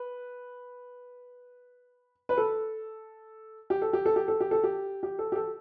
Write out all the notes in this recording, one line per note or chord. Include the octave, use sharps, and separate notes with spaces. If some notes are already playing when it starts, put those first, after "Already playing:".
Already playing: B4
B4
A4
G4
A4
G4
A4
G4
A4
G4
A4
G4
G4
A4
G4
A4